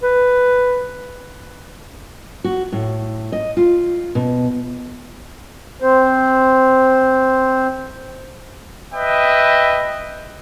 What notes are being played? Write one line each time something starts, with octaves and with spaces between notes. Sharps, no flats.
B4
F#4
A2
D#5
F4
B2
C4 C5
B4 D#5 E5 G5